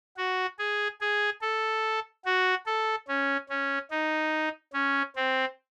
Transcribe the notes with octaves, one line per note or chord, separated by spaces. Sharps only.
F#4
G#4
G#4
A4
F#4
A4
C#4
C#4
D#4
C#4
C4